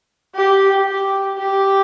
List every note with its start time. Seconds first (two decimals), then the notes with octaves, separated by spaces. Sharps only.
0.35 G4
0.87 G4
1.38 G4